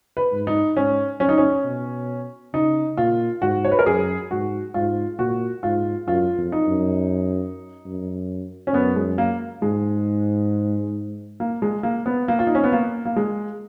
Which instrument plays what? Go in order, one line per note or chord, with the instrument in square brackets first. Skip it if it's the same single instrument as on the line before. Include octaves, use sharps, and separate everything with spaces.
[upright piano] B4
[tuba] G#2
[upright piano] D#4
[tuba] G#2 [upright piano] C#4
[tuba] F#2 [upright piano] C#4
[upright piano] D#4
C#4
[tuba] B2
[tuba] C#3 [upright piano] D#4
[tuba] A#2 [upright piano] F4
[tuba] G#2 [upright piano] F#4
[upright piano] C#5
B4
A#4
[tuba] F#2 [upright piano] G#4
[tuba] G#2 [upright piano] F#4
[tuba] G#2 [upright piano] F4
[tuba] A#2 [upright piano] F#4
[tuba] G#2 [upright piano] F4
[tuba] F#2 [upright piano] F4
[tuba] F2
[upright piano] D#4
[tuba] F#2
F#2
[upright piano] C#4
[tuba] F#2 [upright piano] B3
[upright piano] G#3
A#3
[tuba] G#2 [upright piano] G#3
[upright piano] A#3
G#3
A#3
B3
A#3
F4
D#4
C#4
B3
A#3
A#3
G#3